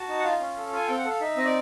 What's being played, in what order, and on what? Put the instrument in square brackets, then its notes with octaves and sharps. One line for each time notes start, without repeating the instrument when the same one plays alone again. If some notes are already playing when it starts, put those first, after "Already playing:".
Already playing: [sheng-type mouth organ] F#4 A5
D#4
F#5
F4 F5
C#4
A4
F4 G#5
C4 G5
F#5
A4 F5
D#4 E5
C4 D#5
D5